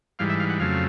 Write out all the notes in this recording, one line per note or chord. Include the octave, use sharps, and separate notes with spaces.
G#2 E3 G3 F5
E5
F5
F#5
F2 C#3 F#3 A3 F5